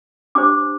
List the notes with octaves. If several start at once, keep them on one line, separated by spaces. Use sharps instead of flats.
D4 G4 C5 D6